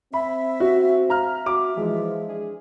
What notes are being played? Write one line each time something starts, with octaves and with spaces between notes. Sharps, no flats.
C4 E5 B5
F#4
E5 F5 A#5 F6
F#4 D6
E3 F3 G#3
D4 G#4